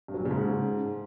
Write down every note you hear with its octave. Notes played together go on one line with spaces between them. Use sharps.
G2
F#3
A#2
C#3
G#2